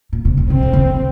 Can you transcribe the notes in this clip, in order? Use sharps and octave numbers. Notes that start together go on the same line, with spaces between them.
A#2
C3
C#3
D#3 C4
C#3
D#3